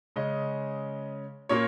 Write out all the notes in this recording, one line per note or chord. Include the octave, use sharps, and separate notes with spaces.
C#3 G#3 C#4 D#5
A#2 A#3 C#4 C#5